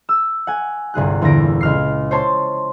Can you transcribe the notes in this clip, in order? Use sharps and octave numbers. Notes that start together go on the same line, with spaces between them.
E6
F#5 G#5
G1 C2 G#4 F#6
E2 A#2 D3 A#6 D7
C#2 F6 C7
C5 C#5 A5 C6